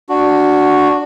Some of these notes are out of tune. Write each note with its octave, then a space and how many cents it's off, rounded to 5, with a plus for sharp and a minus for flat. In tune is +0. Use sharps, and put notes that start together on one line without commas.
D4 +0 F#4 +0